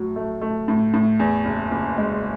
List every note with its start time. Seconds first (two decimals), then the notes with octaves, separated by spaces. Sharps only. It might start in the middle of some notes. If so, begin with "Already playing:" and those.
Already playing: A2 F#3
0.16 A3
0.41 A3
0.68 A2
0.94 A2
1.19 E2
1.45 F#1
1.71 F#1
1.97 G#3